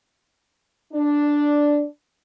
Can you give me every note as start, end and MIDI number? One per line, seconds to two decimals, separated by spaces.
0.93 1.84 62